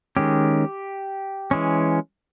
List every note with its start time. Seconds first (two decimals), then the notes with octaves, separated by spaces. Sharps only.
0.17 D#3 G#3 C#4 G4
1.51 E3 G#3 C#4